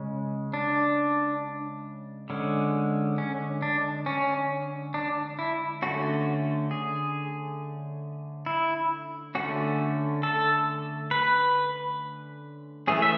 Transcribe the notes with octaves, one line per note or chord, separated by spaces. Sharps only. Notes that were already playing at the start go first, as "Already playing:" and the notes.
Already playing: C#3 G#3 C#4
D4
D3 G#3 C#4
C#4
D4
C#4
D4
E4
D3 A3 C#4 F#4
G#4
E4
D3 A3 C#4 F#4
A4
B4
E3 A3 C#4 G#4
E5